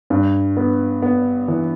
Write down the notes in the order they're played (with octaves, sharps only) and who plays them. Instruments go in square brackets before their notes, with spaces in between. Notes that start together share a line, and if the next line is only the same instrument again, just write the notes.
[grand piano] G2
B3
B3
E3